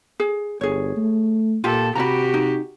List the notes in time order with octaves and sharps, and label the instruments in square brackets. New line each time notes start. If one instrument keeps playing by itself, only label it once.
[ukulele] G#4
[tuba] G1 [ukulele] G#4 C#5
[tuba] A3
[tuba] A#2 [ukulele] F4 G4 [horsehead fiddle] A4
[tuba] C3 [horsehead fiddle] F#4 G4 [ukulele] A#5 B5
[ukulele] D#4